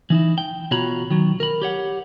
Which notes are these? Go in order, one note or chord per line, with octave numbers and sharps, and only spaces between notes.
E3 D#4 E4
G5
B2 F4 F#4 C#5 A#5 B5
D#3 F#3
A#4 B5
G4 C#5 F#5